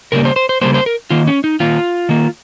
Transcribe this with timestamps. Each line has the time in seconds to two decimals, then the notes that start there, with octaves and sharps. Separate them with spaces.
0.12 C#3 G3 A#3 A#4
0.25 C5
0.36 C5
0.49 C5
0.61 C#3 G3 A#3 C5
0.74 C5
0.86 A#4
1.10 D#3 A#3 F4
1.27 C#4
1.44 D#4
1.60 D#3 A#3 F4
2.09 D#3 A#3